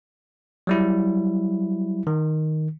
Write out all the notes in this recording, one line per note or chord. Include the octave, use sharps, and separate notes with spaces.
F#3 G3 E4
D#3